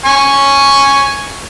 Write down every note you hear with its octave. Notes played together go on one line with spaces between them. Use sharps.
G#5 C#6